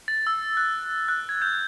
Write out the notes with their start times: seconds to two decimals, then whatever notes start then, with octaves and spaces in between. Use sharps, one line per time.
0.08 A6
0.27 E6
0.57 F#6
1.08 F#6
1.29 G#6
1.42 G6